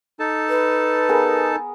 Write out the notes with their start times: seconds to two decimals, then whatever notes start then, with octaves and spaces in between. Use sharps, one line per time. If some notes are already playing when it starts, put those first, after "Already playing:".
0.20 D#4 A4 A5
0.49 B4
1.09 B3 G#4 A#4